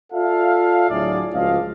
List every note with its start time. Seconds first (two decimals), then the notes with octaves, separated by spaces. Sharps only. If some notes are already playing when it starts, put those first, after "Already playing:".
0.13 F4 A4 D5 E5 F5
0.89 D2 A2 F#3 G#4 D5
1.34 C#2 F3 F#4 D#5 F5